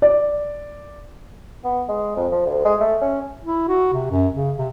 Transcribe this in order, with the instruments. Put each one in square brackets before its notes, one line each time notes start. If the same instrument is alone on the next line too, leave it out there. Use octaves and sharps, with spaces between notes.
[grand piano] D5
[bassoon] B3
G#3
F2
F3
D2
G#3
A3
C#4
[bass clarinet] E4
F#4
C3
F#2
C#3
C3